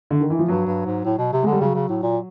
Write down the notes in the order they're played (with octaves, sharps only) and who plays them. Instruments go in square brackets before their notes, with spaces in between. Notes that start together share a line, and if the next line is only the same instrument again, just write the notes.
[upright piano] D3
D#3
E3
F3
[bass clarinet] G2 [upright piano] F#3
[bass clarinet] G2
G#2
A2
B2
C3
[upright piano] G#3
[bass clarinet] D3
[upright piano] G3
[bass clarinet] C#3 [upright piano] F#3
[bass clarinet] C#3
A2
A#2